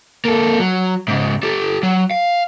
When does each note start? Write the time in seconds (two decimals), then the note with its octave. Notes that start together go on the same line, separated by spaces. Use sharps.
0.25 A#3 A4
0.60 F#3
1.08 G#2 C#3
1.43 G4 A4
1.83 F#3
2.11 F5